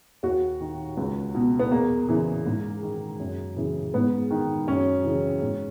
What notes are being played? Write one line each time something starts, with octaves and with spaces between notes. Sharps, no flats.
D#2 F#4
D#3
C#2
B2
B3
E2 A#3
C#3 E3
G#2
D#3
F#2
C#3 E3
G#2 B3
D#3
F#2 C#4
C#3 E3
G#2